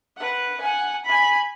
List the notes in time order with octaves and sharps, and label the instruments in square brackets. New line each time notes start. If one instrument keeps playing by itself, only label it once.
[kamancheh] B4 F#5
F#5 G#5
G#5 B5